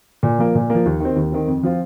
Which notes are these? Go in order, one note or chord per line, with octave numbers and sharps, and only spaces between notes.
A#2
F3 A#3
A#2
F3 A#3
D#2
D#3 C4
D#2
D#3 C4
F2
F3 C4 F4